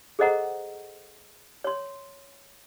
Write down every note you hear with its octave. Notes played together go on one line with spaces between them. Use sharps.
G#4 A4 C5 D#5 F#5 A#5
C#5 C6